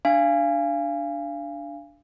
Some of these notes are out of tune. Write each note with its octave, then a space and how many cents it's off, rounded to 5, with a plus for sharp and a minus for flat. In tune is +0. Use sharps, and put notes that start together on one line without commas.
D4 +0 F5 -25 G#5 -20